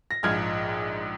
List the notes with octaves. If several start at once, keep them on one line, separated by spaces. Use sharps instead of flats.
A#6
A#1 G#2 F3 F6 G#6